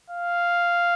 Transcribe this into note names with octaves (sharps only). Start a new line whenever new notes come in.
F5